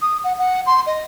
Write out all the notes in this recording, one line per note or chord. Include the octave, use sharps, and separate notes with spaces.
D#6
F#5
F#5
C6
D#5